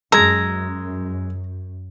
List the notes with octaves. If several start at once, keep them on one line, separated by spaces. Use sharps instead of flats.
F#2 G#3 A#5 E6 G#6